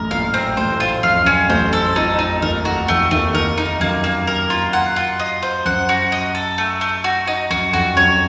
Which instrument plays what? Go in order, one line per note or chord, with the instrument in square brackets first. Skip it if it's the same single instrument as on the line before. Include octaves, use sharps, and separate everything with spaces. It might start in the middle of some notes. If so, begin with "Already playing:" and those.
Already playing: [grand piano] A1 F#2 A2 [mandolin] A#4
[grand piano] A#1 A#2 [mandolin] F5
[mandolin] C4
[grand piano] A1 A2 [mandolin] C5
[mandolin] F4
[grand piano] F#2 [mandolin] F5
[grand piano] F2
[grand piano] F#2 [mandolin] C#4
[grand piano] A1 A2 [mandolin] C5
[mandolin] A4
[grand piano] F2 F3 [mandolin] D#4
[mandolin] D#4
[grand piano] D#2 D#3 [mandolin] A#4
[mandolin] F#4
[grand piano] F2 F3 [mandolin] A3
[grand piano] D#2 D#3 [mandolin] A3
[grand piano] D#2 D#3 [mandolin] A#4
[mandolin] D#4
[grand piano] F#2 [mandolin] A#3
[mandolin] A#3
A#4
F4
F#5
F4
D#5
C5
[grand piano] F#2 [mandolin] F#5
[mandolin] F#4
D#5
A4
A3
A3
F#4
D#4
[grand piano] F#2 [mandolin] F#4
[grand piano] F2 [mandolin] F#4
[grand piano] F#2 [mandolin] C#5